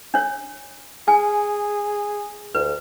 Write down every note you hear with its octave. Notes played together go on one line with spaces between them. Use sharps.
D4 C#5
G#4 G#5
D2 B4